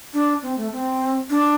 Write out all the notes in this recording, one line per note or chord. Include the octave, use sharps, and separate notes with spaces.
D4
C4
A3
C4
D4